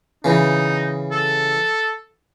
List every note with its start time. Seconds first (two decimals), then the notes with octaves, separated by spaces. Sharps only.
0.24 C#3 E3 D#4
1.11 A4